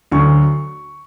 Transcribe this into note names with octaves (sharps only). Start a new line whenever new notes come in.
D2 D3 F#3 C#6